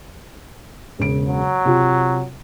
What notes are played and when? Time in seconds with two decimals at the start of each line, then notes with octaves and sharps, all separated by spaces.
0.99 E1 C#3 D7
1.28 F#3
1.65 C3 F4